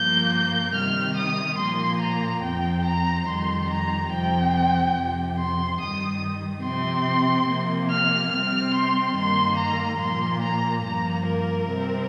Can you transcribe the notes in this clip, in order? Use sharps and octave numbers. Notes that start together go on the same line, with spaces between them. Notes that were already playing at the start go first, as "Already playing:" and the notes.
Already playing: G2 F3 A#3 G6
G6
C3 D#3 G3 F6
D#6
A#2 F3 A#3 C6
A#5
F2 F3 C4 G5
A#5
F2 D#3 G3 C6
A#5
F2 C3 F3 C4 G5
F2 C3 F3
C6
G2 D#3 G3 D#6
C3 F3 C4 C6
C3 F3 A#3
F6
C3 G3 C4 F6
C6
G2 D#3 G3 A#3 C6
A#5
A#2 F3 A#3 C6
A#5
G2 F3 A#3 A#5
A#4
C3 G3 C4